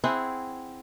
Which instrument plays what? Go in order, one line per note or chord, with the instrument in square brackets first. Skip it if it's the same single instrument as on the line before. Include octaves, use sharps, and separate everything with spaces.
[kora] C4 E4 G#4 F#5